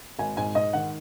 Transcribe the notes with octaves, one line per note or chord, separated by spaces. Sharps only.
G#1 G#5
G#2 G#5
G#2 D#5
D#3 F#5